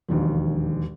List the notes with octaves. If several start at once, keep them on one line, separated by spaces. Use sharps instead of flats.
E1 A#1 D#2